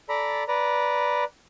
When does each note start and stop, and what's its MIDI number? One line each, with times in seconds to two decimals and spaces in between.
0.09 0.44 69
0.09 0.44 74
0.09 0.44 82
0.09 0.44 83
0.48 1.24 71
0.48 1.24 74
0.48 1.24 82